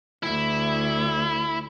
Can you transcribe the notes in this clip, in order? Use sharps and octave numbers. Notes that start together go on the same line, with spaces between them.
D2 E4